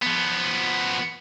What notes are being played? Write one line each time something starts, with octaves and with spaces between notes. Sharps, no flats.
F3 B3